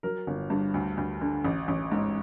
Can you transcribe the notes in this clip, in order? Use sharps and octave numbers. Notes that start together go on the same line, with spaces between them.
F#3 A#4
G1
G2
D2
D2
D3
A1
A1
G#2